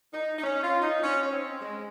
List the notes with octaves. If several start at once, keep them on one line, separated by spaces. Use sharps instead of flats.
D#4
D#4
C#4
F4
D#4
C#4
C#4
C4
G#3